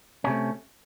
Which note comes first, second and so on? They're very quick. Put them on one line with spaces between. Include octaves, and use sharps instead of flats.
C#4 C3 A3